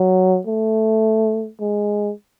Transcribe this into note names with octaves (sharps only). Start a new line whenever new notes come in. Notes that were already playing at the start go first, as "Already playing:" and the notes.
Already playing: F#3
A3
G#3